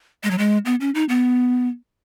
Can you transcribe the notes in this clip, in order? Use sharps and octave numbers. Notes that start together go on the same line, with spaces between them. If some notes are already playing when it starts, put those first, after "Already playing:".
G#3
F#3
G#3
B3
C#4
D#4
B3